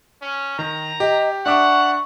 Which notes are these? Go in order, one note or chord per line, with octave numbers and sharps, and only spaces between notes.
C#4
D#3 A#5
G4 D#5
D4 E5 F#5 C#6 D6